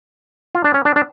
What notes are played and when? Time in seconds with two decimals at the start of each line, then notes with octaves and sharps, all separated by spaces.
0.55 F4
0.64 D4
0.74 C#4
0.85 D4
0.96 D4